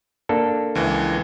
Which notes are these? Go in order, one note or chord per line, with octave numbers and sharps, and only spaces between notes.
A#3 D4 A4
C#2 E3